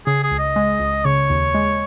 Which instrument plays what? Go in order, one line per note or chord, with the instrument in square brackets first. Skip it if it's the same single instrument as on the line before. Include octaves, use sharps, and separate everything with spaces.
[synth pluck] C#3 [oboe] G#4
[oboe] G#4
[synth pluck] C#2
[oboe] D#5
[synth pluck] G#3
C#2
[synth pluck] C#3 [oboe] C#5
[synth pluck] D#2
G#3